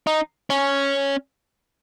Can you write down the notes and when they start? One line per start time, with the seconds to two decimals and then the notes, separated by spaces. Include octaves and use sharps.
0.07 D#4
0.50 C#4